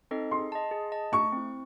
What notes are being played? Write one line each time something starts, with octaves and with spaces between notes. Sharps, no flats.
C4 D#4 A4 D#5
G#4 C6
D#5 A5
G#4
D#5 A5
A3 C#6
C4 E4